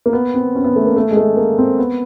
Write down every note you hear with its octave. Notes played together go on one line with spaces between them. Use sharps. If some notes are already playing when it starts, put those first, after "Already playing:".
A#3
B3
C4
C#4
B3
A3
A#3
A3
G#3
A3
A#3
C4
B3